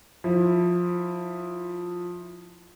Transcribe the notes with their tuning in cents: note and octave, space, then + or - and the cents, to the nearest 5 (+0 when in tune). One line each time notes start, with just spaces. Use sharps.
F3 +15 E4 +0